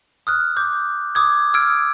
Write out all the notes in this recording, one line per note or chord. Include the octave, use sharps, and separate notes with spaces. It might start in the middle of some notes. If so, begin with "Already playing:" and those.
D#6 F6 F#6
D6 G6
D6 D#6 G#6
E6 F6 G#6 D7